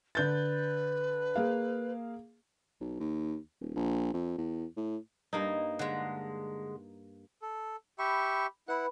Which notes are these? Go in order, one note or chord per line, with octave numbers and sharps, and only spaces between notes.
D3 B4 G6 A6
A#3 G#4 F5
B1
D#2
D#1
A#1
F2
E2
A2
G2 A#3 D#4
D3 G#3
A4
G4 E5 B5 C#6
E4 B4 F#5 B5